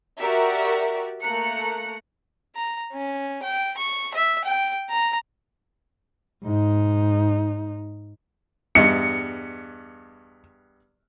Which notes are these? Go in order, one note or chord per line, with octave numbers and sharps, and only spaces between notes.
F#4 G4 A#4 D5 E5
A3 A#3 A#5 F#6 C#7
A#5
C#4
G5
C#6
E5
G5
A#5
G#2 D#4
E2 G2 D#5 C#7